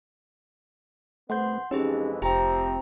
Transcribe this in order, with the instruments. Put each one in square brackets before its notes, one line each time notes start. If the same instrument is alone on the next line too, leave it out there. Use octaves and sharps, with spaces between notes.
[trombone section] C2 B3 C5 [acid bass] A3 [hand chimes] F#5 C6 G6
[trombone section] F2 E3 G#3 [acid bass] C#4 [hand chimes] D#4 G4 G#4
[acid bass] F1 [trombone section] C3 F3 C4 [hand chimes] G4 G5 [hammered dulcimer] A#5